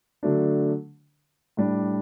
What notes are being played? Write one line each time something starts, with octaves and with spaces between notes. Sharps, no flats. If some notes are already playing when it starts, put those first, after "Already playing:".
D3 F#3 A3 D4
A2 G3 D4